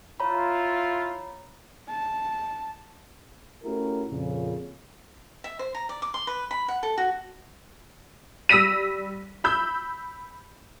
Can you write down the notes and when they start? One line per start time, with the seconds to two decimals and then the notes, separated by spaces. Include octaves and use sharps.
0.20 E4 F4 C#5 A#5 B5
1.88 A5
3.64 A3 C#4 E4 F#4 G4 A#4
4.10 F2 A#2 C#3
5.44 E5
5.59 C5
5.75 A#5
5.89 D5
6.02 D6
6.14 C6
6.27 B4
6.51 B5
6.68 F#5
6.83 A4
6.98 F#4
8.49 G3 E6 A#6 B6 D#7
9.44 B5 E6 G6